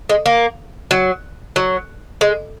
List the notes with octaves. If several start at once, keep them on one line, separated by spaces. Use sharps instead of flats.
G#3
A#3
F#3
F#3
G#3